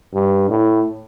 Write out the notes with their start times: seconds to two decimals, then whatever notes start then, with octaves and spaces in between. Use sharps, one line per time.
0.14 G2
0.50 A2